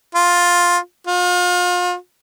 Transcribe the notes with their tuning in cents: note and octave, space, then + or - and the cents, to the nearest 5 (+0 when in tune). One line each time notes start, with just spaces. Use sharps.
F4 +10
F4 +35